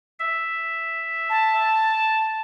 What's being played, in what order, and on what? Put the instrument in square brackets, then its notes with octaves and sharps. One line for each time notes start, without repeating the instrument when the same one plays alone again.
[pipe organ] E5
[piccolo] A5